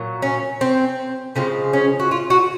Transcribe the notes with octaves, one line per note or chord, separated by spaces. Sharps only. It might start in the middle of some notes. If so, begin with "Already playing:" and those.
Already playing: A#2 F#3
C#4
C4
C#3 F3 G#3 C4
C#4
F#4
F4
F#4